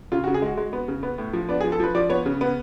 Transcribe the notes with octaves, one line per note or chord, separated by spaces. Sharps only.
C#3 F4
F#4
C#3
G#4
G#3 F#4
G#3
B3
C#3
B3
A2
F3
B3 D4
G#4
F3
A4
F3 B4
F3 D5
B3 C#5
C#3
B3